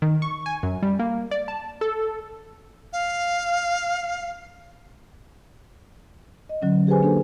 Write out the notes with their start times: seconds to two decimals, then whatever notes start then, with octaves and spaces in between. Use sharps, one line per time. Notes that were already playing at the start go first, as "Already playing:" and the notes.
0.02 D#3
0.22 C#6
0.46 G#5
0.63 F#2
0.83 G3
0.99 A#3
1.31 D5
1.48 A5
1.81 A4
2.93 F5
6.49 D#5
6.62 D3 F#3 C#4
6.87 G4 G#4 B4 C5 G#5
7.02 A#3 D4 A4 C5